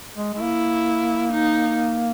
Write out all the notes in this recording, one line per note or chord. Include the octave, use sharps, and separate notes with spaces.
G#3
G#3
A#3 E4
D#4